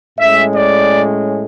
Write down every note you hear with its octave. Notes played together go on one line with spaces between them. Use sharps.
A2 G#3 C#4 E5
D5